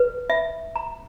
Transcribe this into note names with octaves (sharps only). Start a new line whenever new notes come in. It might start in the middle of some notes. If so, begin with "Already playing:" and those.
Already playing: B4
E5
A#5